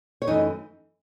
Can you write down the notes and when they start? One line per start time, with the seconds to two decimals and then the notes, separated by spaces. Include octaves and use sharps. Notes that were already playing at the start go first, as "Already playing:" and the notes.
0.22 C#5
0.27 F#2 E3 A3 D#4 D#5